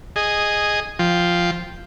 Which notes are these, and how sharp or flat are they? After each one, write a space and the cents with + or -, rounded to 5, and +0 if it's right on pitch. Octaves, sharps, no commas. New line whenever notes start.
G#4 +0 D#5 -5
F3 +0 G5 +0